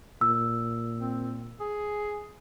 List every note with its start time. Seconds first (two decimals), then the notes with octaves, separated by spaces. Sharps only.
0.21 A#2 E6
0.99 C4
1.60 G#4